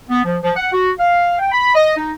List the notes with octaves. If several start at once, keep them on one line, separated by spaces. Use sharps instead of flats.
B3
F3
F3
F#5
F#4
F5
G5
B5
D#5
D#4